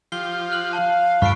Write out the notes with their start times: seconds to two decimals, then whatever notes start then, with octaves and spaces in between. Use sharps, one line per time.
0.12 F3 F4 G4 C7 G7
0.52 F6 F#6 F#7
0.73 F5 A5
1.22 G2 G3 A3 F4 B5 C#6 C7 D7